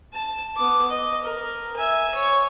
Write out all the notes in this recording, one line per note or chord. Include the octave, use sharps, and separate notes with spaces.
A5
B3 D6
D#5
A#4
E5 G#5
C#5